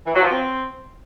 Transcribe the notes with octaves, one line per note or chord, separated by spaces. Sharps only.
E3
F#3
F3
C4